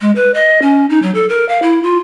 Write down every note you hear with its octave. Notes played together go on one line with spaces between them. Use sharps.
G#3
B4
D#5
C#4
D#4
F#3
A4
A#4
F5
E4
F4